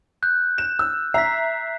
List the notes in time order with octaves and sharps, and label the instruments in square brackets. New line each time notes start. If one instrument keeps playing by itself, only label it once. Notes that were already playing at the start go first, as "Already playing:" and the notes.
[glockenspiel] F#6 G6
[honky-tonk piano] E7
E6
[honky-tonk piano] E5 A#5 [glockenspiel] B6 C7